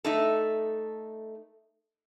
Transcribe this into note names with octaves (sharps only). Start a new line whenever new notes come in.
A3 D#4 A4